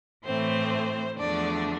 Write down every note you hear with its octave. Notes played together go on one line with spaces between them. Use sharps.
A2 E3 A3 C4 C5
E2 D3 F3 A3 D4 D5